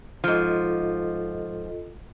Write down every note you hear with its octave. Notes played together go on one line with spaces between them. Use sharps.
G#2 F3 F4 A4 D#5